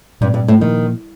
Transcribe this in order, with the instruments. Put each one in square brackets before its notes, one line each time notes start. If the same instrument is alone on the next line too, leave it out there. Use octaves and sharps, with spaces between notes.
[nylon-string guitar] G2 [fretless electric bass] A#2 G3 C4
[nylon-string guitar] G2
A2
[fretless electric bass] A#2 F3 A#3 [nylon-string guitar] D#3